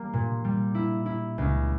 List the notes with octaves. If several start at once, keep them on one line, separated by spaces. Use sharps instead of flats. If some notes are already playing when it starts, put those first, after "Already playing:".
Already playing: G3 A#3
A#2
G3
E4
E4
C#2